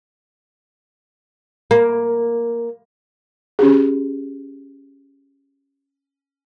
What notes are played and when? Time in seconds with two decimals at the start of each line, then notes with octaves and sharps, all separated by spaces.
1.71 A#3
3.59 C#4 G4 G#4